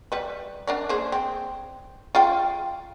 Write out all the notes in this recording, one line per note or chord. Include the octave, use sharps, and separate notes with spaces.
G3 B4
D4 A#4 D5
A#3 G#4 C5
C4
F4 F5 G5